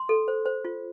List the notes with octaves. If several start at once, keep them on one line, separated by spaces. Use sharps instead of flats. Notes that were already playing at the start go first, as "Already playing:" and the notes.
Already playing: C6
A4
C5
C5
F4